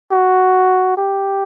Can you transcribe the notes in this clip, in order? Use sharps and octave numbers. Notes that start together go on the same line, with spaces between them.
F#4
G4